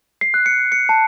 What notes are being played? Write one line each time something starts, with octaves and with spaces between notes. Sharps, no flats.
C7
F#6
C#7
C#7
A5